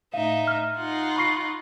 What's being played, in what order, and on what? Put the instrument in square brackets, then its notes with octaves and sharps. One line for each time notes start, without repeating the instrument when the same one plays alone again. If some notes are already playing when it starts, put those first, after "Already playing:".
[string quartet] A2 D#4 E5 [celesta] F5
[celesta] F6
[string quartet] D#4 F4 F#5
[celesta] B5 C#6 C7